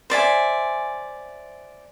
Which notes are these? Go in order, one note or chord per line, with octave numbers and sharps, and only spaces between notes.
C5 D5 E5 G#5